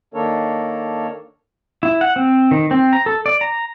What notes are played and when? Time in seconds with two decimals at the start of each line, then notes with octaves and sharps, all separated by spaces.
0.14 D#3 A#3 D4 A4 A#4 C#5
1.83 E4
2.01 F#5
2.16 C4
2.51 D#3
2.71 C4
2.93 A#5
3.06 A4
3.26 D5
3.41 A#5